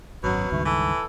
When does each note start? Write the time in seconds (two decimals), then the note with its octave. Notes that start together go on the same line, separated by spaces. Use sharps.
0.24 G#1 F#2 B2 F#3
0.52 C#2 G2 D#3 A3
0.66 E3 A4